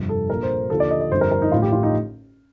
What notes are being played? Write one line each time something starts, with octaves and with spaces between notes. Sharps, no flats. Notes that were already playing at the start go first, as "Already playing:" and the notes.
Already playing: G1 F2 C3 F3
A4
A#1 A#2 F3 A#4
C5
D#2 D3 F3 A4
D5
D#5
D#5
G1 F2 D3 F3 C5
A#4
A#4
D#4
A1 A2 F3 F4
G4
F4
D#4